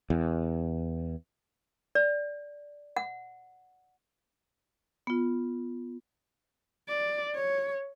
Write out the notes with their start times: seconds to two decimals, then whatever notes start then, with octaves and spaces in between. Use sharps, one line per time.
0.10 E2
1.95 D5
2.96 F#5
5.07 B3 F4
6.88 D5
7.35 C#5